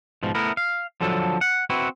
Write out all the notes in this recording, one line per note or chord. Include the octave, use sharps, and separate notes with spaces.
G#2 B2 F3
A3 B3 E4 A#4
F5
D3 F3 F#3 A4
F#5
C4 E4 F#4 B4